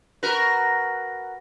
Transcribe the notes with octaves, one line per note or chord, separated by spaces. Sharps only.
F#4 A#4 B4